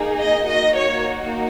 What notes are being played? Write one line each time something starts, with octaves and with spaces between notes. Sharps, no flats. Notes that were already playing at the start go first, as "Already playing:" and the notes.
Already playing: A#3 D#4 G#4
D#5
A#3 D#4 F#4 D#5
C#5